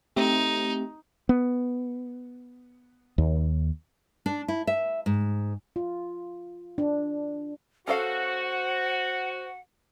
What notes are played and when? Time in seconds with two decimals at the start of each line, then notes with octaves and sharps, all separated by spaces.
0.16 A3 C4 D#4 G4
1.29 B3
3.18 D#2
4.26 D4
4.48 E4
4.67 E5
5.06 G#2
5.76 F4
6.78 D4
7.88 C#4 F#4 A4 C5 F5 F#5